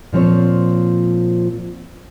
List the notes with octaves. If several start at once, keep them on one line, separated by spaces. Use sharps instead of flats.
A#2 F3 C4 C#5